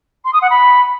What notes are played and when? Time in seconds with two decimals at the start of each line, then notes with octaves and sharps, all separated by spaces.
0.24 C6
0.33 D#6
0.41 F#5
0.50 B5